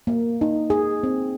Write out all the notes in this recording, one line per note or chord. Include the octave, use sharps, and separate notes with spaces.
A#3
D#4
G#4
C4